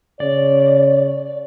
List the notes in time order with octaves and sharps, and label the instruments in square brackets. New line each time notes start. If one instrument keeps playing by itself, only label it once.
[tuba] C#3 [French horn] C#5 [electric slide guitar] D5